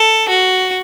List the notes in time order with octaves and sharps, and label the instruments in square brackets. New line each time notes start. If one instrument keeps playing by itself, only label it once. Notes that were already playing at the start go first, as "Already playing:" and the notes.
Already playing: [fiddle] A4
F#4